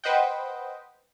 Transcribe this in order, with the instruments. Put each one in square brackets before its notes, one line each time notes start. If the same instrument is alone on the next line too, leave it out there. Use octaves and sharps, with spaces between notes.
[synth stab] B4 C5 D#5 F#5 G5